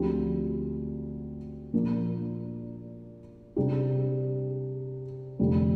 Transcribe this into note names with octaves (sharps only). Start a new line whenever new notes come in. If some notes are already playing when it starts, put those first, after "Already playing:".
Already playing: D2 D3 F3 C4 G4
A#2 F3 A#3 D4
C3 G3 D4 G4
F1 F2 D3 G3